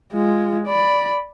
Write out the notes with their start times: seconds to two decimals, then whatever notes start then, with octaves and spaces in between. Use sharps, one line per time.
0.13 G#3 F4
0.67 D5 B5